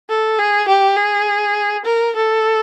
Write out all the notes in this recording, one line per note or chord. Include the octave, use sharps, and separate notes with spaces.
A4
G#4
G4
G#4
A#4
A4